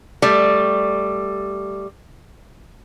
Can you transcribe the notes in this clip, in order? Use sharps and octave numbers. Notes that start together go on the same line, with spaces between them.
G3 A3